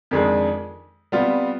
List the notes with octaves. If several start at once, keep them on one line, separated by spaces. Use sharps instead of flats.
F2 D#3 G#3 D4 G#4
C3 G3 B3 F4